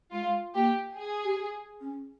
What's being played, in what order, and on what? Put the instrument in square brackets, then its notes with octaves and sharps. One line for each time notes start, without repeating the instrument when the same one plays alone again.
[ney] G#3 [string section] F4
[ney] A#3 [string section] G4
[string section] G#4
[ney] G4
C#4